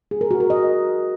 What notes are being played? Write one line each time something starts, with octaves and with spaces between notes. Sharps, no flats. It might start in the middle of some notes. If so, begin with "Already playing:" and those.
G#4
A#4
F#4
A#4
D#5